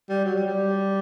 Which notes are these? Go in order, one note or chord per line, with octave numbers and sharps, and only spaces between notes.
G3
F#3
G3
G3